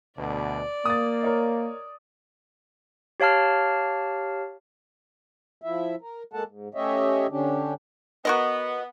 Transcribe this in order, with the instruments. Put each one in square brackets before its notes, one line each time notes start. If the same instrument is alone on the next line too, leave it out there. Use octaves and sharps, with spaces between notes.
[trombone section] D2 B2 [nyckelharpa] D5
[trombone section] A#3 [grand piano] D#6 A6
[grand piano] A#4 C#5 D#5
[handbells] G4 C#5 F5 A5 F6
[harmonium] F3 E4 E5
A#4
G#3 A#3 A4 F#5 A5
G#2
A3 C#4 G4 C#5 D#5 E5
D3 C#4 D4 G4
[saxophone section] B3 [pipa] F#4 A#4 D#5